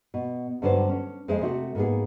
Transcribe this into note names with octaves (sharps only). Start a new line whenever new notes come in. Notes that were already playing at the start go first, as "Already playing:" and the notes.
B2
G2 D3 F#3 B4 C5 D5
C#4
F2 G#3 G#4 C5 E5
C3 A3 F#4
G#2 A#3 B3 G#4